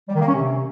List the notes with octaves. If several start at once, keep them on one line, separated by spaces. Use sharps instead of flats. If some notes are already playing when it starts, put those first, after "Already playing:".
G3
D#3
A#3
C#4
C3